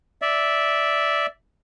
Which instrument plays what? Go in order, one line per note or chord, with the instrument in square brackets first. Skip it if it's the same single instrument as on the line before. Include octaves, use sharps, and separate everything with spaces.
[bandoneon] D5 E5